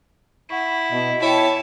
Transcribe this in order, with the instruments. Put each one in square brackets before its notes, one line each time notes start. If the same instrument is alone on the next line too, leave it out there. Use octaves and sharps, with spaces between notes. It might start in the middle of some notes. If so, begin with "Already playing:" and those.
[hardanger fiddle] E4 [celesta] F#5 C#6
[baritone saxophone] B2 [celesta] D#5
[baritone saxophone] E4 [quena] C#5 [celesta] G5 E7 [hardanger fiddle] A5